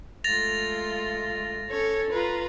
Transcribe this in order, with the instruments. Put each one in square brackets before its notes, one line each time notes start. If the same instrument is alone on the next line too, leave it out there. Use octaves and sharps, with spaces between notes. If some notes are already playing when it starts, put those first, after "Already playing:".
[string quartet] G#3 A3 F4 [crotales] A6 A#6 F7
[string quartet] C#4 A4 C#5
F4 B4 A#5